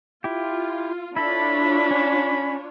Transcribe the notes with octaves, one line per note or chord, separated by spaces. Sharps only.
E4 F4 G4
D4 E4 F4 A4 C#5 B5
C#4